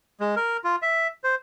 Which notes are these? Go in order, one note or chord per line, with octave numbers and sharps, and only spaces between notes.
G#3
A#4
F4
E5
C5